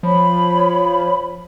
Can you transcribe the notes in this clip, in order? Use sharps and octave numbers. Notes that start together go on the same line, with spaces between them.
F3 C#5 B5